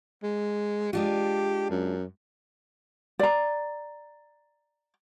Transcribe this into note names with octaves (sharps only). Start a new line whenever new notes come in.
G#3
G#3 D4 F4 G4
F#2
D5 A#5